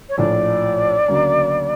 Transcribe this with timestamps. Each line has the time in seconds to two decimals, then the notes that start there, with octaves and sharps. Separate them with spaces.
0.09 C#5
0.18 A#1 A2 F3 A3 D5
1.08 D2 C#3 F#3 A#3